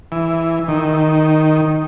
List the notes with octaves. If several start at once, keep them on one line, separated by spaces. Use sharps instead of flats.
E3
D#3